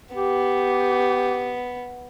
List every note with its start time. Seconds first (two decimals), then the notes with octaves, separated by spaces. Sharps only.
0.15 B3 G4